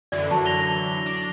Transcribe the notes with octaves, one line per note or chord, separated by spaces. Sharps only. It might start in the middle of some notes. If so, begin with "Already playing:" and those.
F#2 D3 E3 D5
F#3 A5
A#6 F7 G7
D4